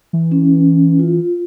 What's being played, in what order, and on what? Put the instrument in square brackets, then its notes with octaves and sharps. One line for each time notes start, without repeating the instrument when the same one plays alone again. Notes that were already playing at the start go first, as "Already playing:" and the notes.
[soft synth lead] E3
[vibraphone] C#4
F4